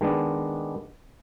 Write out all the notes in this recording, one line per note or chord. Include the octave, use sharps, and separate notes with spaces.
D#3 G#3 B3 D4